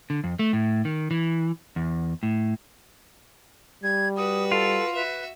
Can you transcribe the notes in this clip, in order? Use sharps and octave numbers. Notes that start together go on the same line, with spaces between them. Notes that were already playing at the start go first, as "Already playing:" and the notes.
D3
F2
A3
A2
D#3
E3
E2
A2
G3 G#6
F#4 B4 D#6
F4 A4
F#4 B4 E5